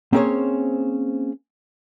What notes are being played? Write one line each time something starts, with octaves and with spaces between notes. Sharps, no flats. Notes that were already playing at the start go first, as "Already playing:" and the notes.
A#3 C4 C#4 G#4 C5 C#5